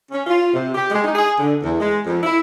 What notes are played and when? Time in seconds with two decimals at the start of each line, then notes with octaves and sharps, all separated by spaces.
0.11 C#4
0.27 F4
0.53 C3
0.75 G4
0.91 G#3
1.04 D#4
1.15 G#4
1.39 D3
1.62 E2
1.80 G#3
2.06 F2
2.23 E4